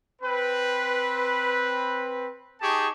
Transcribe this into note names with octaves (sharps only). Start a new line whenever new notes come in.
C4 B4
D#4 G4 G#4 A5 C#6